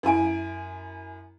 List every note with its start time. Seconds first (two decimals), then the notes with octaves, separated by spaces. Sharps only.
0.03 F#2 E4 G#5 D7